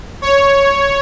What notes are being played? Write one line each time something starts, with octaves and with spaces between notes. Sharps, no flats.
C#5